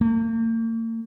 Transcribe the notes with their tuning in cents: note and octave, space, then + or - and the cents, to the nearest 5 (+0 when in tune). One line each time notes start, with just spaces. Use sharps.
A#3 -45